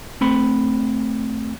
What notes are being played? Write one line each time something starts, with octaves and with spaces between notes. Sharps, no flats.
A3 C4 B5